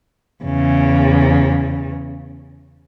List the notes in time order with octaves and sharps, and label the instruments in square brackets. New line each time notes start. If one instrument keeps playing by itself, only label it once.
[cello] E2 C#3